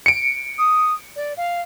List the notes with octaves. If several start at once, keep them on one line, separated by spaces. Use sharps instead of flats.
C#7 D7
D#6
D5
F5